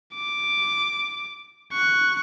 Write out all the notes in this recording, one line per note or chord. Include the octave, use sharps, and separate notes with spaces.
D6
C#6 F#6